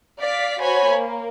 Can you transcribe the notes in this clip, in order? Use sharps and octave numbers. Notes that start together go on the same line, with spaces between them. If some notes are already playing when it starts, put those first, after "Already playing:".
D5 F5 B6
F#4 C5 C#5 G#5 B5
A#3